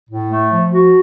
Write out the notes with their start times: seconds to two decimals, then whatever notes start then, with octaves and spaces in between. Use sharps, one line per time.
0.08 A2
0.29 A3
0.51 F3
0.73 F#4